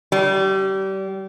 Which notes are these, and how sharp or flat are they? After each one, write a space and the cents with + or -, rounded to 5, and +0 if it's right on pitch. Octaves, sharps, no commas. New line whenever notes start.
G3 -30